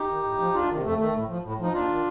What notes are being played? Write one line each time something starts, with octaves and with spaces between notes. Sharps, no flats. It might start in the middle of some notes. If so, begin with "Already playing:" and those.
Already playing: D#4 G4
D#3
A2
F3
D2 D4 F4
C3 D#3
F2 A3
D#3 A3
A2
F3
A2
F3 D#4
D#2 D4 F4
D#3